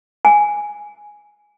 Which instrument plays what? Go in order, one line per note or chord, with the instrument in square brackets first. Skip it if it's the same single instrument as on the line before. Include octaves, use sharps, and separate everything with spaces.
[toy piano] G#5